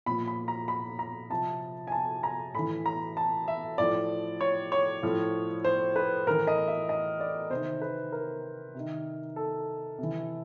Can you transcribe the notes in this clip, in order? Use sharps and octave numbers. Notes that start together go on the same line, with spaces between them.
A#2 F3 B5
B5
A#5
B5
A#5
C3 F3 A5
G#5
A5
A#5
A2 E3 B5
A#5
A5
E5
A2 F3 D5
C#5
C#5
A2 F3
C5
B4
A2 E3 A#4
D#5
E5
D#5
D5
C3 D#3 C5
B4
A#4
C3 D#3
A4
C3 E3